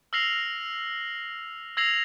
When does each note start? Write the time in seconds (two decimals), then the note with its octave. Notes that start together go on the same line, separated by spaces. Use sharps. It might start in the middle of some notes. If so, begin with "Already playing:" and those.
0.13 E6 F6 A#6 C7 F7
1.77 E6 G#6 A#6 C7 F7 F#7